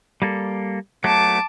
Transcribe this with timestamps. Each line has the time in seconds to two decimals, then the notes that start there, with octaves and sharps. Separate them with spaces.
0.22 G3 A#3 A4
1.04 F#3 A3 A5 D6